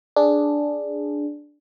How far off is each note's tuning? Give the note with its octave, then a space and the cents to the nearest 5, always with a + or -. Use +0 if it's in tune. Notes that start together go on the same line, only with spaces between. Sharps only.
D4 +0 G#4 +0